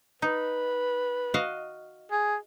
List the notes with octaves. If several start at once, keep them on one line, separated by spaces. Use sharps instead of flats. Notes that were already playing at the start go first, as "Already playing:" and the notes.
D#4 B4
F#4 D#5 F5
G#4